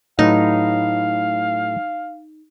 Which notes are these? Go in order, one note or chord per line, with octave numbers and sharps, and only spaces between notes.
A2 F#3 D#4 B4 F5